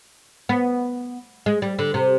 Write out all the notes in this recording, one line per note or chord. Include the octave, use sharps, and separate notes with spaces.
B3
G#3
G3
D3
C3